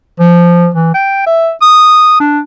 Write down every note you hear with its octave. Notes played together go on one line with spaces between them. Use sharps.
F3
E3
G5
E5
D#6
D4